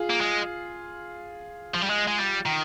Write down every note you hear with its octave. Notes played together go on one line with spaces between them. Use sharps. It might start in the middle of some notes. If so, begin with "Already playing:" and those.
Already playing: F4 G#4
A#3
G#3
F3
G3
G#3
G#3
G3
D#3